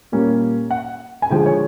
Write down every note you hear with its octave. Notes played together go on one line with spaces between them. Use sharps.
A#2 G3 A#3 C#4
F#5
G#5
D3 F3 G#3 G5
C#5